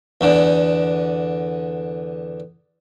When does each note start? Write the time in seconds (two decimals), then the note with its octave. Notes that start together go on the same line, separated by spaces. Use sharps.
0.21 E2 D3